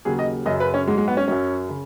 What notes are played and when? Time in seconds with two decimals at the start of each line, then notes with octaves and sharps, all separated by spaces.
0.05 D#2 C#3 F#3 G#4
0.19 D#5
0.46 F#2 C#3 F#3 D#5
0.60 B4
0.74 C#4
0.86 G#2 F#3 G#3
0.98 G#3
1.08 B3
1.17 C#4
1.28 F#2 F#3 C#4
1.69 C#3